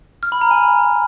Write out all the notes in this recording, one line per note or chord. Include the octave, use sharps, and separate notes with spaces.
F6
B5
A#5
G#5